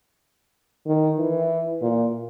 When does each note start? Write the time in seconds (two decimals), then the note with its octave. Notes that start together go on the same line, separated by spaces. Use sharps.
0.87 D#3
1.19 E3
1.82 A#2